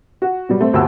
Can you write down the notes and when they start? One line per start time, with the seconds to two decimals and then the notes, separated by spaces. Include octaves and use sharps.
0.22 F#4
0.49 B2 F#3 G3
0.61 A3 C4
0.73 G1 D2 F#4 G4 A5 E6